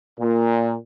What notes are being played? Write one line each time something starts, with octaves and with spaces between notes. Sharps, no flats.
A#2